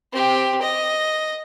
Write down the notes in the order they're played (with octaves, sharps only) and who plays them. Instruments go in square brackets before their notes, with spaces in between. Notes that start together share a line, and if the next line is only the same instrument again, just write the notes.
[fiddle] C4 G4
D#5